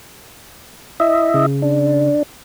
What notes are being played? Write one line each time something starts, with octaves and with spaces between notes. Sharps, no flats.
E4 D#5 E5
C#3
D4